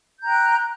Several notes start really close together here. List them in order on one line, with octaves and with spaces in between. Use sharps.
G6 A#5 G5 F#6